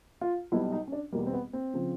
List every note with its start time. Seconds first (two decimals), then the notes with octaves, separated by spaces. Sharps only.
0.21 F4
0.52 B1 B2 G3 E4
0.72 D#4
0.87 C#4
0.92 D4
1.12 E2 B2 G3 A#3
1.27 C4
1.33 B3
1.53 C4
1.74 C#3 F3